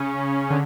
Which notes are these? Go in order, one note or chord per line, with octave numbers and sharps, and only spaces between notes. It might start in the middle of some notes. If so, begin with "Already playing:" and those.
Already playing: C#3 C#4
D3